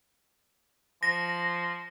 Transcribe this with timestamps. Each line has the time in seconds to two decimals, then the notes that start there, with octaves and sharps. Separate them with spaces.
1.03 F3 A#6